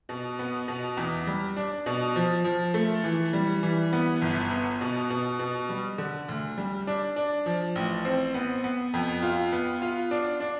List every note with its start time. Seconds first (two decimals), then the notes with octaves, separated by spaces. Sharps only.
0.09 B2
0.39 B3
0.68 B2
0.97 E2
1.27 G3
1.56 D4
1.86 B2
2.16 F3
2.44 F3
2.74 A3
3.04 E3
3.33 G3
3.63 E3
3.93 B3
4.22 G1
4.51 B3
4.81 B2
5.10 B2
5.39 B2
5.69 G3
5.98 D3
6.29 D2
6.58 G3
6.87 D4
7.16 D4
7.46 F3
7.75 A1
8.05 C4
8.34 B3
8.64 B3
8.93 F2
9.23 F4
9.53 B3
9.82 F4
10.11 D4
10.40 D4